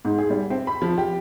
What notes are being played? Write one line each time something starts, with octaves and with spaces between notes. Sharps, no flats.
G#2
G#4
G3
C4
B5
F3
G4